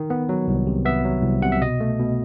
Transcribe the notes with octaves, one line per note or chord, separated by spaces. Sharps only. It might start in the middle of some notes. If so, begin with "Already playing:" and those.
Already playing: D#3
B3
F#3
C2
C3
B3 E5
F#3
C2
C3 F#5
E5
B2 D#5
A3
B2